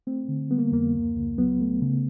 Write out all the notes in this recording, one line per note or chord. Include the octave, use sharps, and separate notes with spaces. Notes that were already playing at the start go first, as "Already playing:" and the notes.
A3 C4
D3
G3 B3
A#3
F2 A#3
C#2
C#2
F#3 B3
A3
C#3